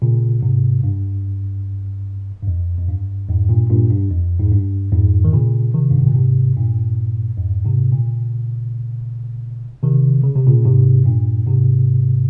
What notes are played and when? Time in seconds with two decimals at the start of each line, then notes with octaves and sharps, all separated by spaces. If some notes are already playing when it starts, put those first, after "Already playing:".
0.02 A#2 C#3
0.43 G#2 C3
0.83 G2
2.42 G2
2.47 F2
2.78 F2
2.88 G2
3.29 F2 G#2
3.49 G2 A#2
3.70 G2 A#2
3.90 G2
4.11 F2
4.40 G#2
4.51 G2
4.92 F2 G#2
5.25 D#3
5.33 A#2 C#3
5.74 C3 D#3
5.90 G2
5.99 G#2
6.07 A#2
6.15 G#2 C3
6.56 G2 A#2
7.37 F2 G#2
7.65 G#2 C3
7.92 A#2 C#3
9.83 C3 D#3
10.24 C#3
10.36 C3
10.47 A#2 C#3
10.65 G#2 C3
11.05 G2 A#2
11.46 G#2 C3